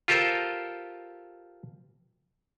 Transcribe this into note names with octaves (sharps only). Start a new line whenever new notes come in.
F4 G4 A4 A#4 C5